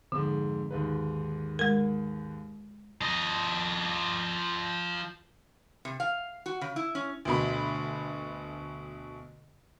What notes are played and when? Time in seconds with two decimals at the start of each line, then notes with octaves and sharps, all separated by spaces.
0.12 F2 G#2 D3
0.71 D#2 G#2 B4
1.59 G#3 A#4
3.01 F3 D#5
5.85 C3
6.00 F5
6.46 F#4
6.61 C#3
6.76 E4
6.95 C#4
7.25 D2 B2 B5